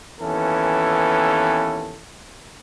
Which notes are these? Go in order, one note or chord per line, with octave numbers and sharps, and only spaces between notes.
D#2 E3 B3 C#4 A4